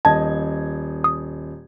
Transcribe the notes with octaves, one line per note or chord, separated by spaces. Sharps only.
D#1 D#5 A5 G#6
D#6